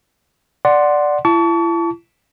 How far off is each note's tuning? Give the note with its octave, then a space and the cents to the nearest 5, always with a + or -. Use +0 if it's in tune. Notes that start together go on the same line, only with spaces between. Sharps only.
D5 +0 F#5 +0 C6 +0
E4 +40 A5 +0 C#6 +40